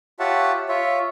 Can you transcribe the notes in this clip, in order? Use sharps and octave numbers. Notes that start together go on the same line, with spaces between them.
F4 G4 C#5 E5 F#5 A5
F4 C#5 E5